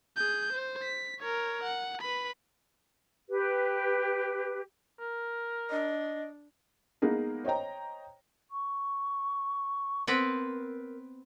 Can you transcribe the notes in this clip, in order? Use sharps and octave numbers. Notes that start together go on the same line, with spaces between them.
G#4 G6
C5
B6
A#4 C#5
F#5
B4 B5
G4 B4
A#4
D4 D#5
G#3 A#3 B3 D#4 G#4 A#4
C5 C#5 D#5 G5 A#5
C#6
B3 C4 A#4 B4